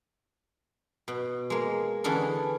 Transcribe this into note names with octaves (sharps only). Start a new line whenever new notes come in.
B2
G#3 A#3
D3 E3 C#4 G#4 A4